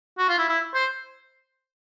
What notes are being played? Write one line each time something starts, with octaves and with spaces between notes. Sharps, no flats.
F#4
F4
E4
E4
C5